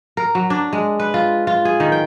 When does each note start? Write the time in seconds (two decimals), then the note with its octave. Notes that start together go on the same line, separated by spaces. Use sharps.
0.17 A#4
0.35 F#3
0.50 D4
0.73 G#3
0.99 B4
1.14 F4
1.47 F4
1.65 G#4
1.80 D#3
1.92 G5